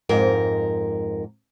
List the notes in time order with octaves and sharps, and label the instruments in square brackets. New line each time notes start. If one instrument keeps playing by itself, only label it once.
[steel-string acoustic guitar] F2 G#2 A#4